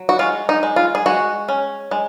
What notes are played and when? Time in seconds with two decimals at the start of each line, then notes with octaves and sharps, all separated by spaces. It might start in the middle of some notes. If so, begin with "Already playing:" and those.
Already playing: F#3
0.09 F#4
0.19 G#3 F4
0.49 D#4
0.63 G#3
0.76 F4
0.95 G#4
1.06 G#3 F#4
1.48 C#4
1.91 G#3